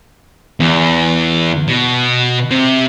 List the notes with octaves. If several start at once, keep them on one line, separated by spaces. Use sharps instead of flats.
E2
B2
C3